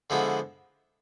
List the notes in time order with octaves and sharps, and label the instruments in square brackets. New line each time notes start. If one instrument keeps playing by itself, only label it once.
[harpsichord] D3 F3 G#3 B3 E4